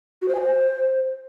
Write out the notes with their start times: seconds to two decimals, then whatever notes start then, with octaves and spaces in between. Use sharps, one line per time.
0.22 F#4
0.28 C5
0.35 G#5
0.41 C5